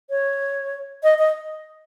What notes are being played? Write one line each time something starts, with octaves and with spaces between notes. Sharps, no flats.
C#5
D#5
D#5